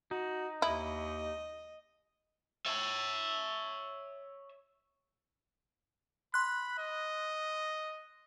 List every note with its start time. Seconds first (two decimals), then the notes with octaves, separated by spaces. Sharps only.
0.11 D#4 F#4
0.62 D#2 E4 D#5
2.66 C#5 E5
6.34 B5 C6 F#6
6.78 D#5